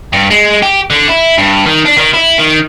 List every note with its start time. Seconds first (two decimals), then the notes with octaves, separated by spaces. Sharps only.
0.13 G2
0.30 G#3
0.63 G4
0.90 D3
1.08 E4
1.38 G2
1.66 D#3
1.85 D4
1.97 D#3
2.13 E4
2.38 D#3